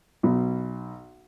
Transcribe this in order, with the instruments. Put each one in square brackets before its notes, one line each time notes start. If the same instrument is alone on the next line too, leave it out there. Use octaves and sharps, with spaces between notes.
[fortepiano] B1 B2